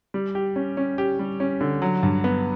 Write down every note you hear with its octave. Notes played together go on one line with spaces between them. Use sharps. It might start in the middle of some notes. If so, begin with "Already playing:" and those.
G3
G4
C#4
C#4
G4
G3
C#4
D3
F#3
G2
B3